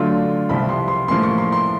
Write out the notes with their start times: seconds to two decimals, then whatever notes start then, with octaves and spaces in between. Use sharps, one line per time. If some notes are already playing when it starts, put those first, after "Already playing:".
Already playing: D3 F#3 A3 D4 F4 C6
0.49 C2 C3 F3 B5
0.69 C6
0.88 C6
1.08 A2 F3 A#3 C#4 C6
1.24 C#6
1.38 C6
1.52 C6